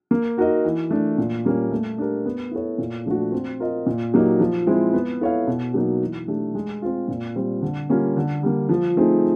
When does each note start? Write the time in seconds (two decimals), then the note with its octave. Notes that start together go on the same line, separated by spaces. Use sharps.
0.11 A#3
0.37 D#4 F#4 A#4 D#5
0.65 E3
0.91 A3 D4
1.18 A#2
1.45 G3 A#3 C#4
1.71 A3
1.98 D4 G4 A#4
2.25 B3
2.51 E4 A4 C#5
2.78 A#2
3.06 F3 A3 D4 F#4
3.32 C4
3.60 F4 A#4 D#5
3.86 A#2
4.14 F#3 A#3 D#4 G4
4.40 F3
4.67 G#3 C4 E4
4.93 B3
5.21 E4 A4 C#5 F5
5.47 B2
5.74 F#3 A#3 D#4
6.01 E3
6.28 A3 D4 G4
6.55 G#3
6.82 C4 F4
7.08 A#2
7.36 G3 C4
7.62 D3
7.89 G3 A#3 C#4 F4
8.16 D3
8.43 G3 A#3
8.69 F3
8.97 A3 C4 D#4 G#4